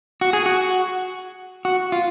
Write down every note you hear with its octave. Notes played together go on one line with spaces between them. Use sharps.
F#4
G#4
F#4
F#4
F4